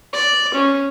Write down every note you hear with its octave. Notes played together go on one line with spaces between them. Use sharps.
D5
C#4